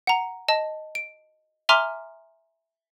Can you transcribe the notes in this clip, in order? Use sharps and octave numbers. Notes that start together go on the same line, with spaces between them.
F#5 A#5
D#5 A5
D7
E5 G#5 A#5 C6 D6 F6